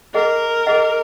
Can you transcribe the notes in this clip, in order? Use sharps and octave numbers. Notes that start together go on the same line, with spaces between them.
G#4 A#4 D#5 F#5
G#4 D#5 F#5